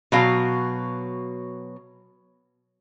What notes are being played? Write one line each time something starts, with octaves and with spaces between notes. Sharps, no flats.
B2 F#3 F5